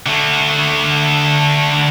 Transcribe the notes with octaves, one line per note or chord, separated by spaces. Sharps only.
D3 A3